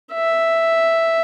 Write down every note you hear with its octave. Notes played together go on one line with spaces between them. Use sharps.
E5